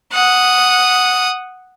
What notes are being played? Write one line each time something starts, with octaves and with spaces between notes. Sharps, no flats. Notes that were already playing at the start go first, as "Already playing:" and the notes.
F#5 D#6